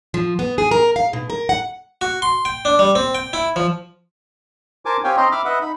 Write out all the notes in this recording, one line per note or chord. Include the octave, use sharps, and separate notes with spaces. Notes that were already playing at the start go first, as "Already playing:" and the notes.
F3
B3
G#4
A#4
F5
B2
A#4
F#5
F#4
C6
G5
D4
G3
C4
G5
E4
F3
A#4 C5 G#5 A5 D6
C4 G4 C#5 F5 G5 G#5
C4 C5 D#5 A#5 C6
E5 B5 D6 F6
B4 D#5 E5 F#5
D#4 B5